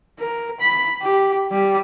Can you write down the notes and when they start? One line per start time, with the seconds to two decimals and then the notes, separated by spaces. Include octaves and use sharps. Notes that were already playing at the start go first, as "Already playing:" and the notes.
0.20 A#4
0.60 B5
1.01 G4
1.52 G3